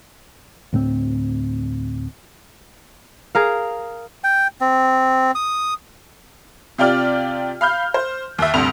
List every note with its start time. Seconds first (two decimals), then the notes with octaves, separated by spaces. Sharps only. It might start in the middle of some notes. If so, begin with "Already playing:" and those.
0.73 D2 A2 G3 C4
3.35 G#4 A#4 F5
4.24 G5
4.61 C4
5.35 D#6
6.78 C3 F4 G4 D5 F6
7.61 F5 B5 F6 G6
7.94 C5
8.38 D#2 E5
8.54 D2 G2 C3 F7